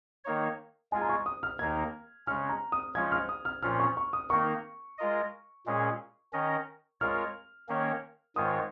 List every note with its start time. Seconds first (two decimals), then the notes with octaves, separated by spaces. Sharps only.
0.25 D#3 A#3 D#4 C#5
0.92 G#3 F4 G#4 G#5
1.02 A#5
1.09 C#6
1.26 D#6
1.43 F6
1.59 D#2 D#3 A#3 D#4 A#4 G#6
2.27 C#3 G#3 C#4 F6
2.49 A#5
2.72 D#6
2.95 F3 G#3 C#4 F4 G#6
3.12 F6
3.29 D#6
3.45 F6
3.62 A#2 F3 C#4 F4 F6
3.80 C#6
3.97 C#6
4.13 D#6
4.30 D#3 A#3 D#4 A#4 C#6
4.98 G#3 F4 A#4 D#5
5.66 A#2 G#3 C#4 G#4
6.33 D#3 C#4 A#4 D#5
7.01 G#3 F4 A#4 C#5 F6
7.69 D#3 A#3 C#4 A#4 C#5
8.36 G#2 D#3 G#3 F4 C#5 D#6